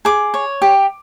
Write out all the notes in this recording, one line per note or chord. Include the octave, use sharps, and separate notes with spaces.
G#4 D6
C#5
G4